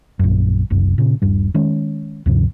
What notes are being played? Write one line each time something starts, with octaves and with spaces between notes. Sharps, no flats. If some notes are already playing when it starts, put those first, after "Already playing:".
A#1 F#2
F#1 C2 F#2
A#2 C#3
D#1 G2 G3
D#3 G#3 C#4
D2 G2 C3 F3